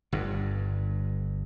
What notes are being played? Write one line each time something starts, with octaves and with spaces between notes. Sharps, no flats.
G1 G2